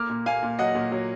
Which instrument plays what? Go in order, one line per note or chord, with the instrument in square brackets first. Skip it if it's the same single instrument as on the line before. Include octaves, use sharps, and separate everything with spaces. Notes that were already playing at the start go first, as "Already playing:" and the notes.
Already playing: [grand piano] A#3 D6 F6
A#2
A#3 F5 G#5
A#2
F#3 D#5 F#5
A#2
F#3